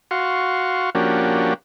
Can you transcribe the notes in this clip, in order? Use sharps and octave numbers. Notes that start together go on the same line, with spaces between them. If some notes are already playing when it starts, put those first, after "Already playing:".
F#4 F5 C6 C#6
F3 A#3 C#4 D4 F#4 G4